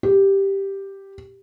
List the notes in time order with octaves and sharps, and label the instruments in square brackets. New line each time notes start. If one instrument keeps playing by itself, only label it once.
[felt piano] G4